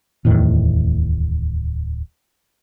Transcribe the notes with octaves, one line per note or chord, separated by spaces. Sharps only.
D1 E2 A2 D#3